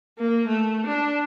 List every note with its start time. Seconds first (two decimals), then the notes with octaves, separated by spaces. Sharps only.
0.18 A#3
0.47 A3
0.87 D4